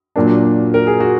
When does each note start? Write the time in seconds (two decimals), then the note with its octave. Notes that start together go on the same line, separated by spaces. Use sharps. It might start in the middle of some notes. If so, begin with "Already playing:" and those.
0.16 A#2 F#3 A#3 D4
0.74 A#4
0.87 G#4
1.00 F#4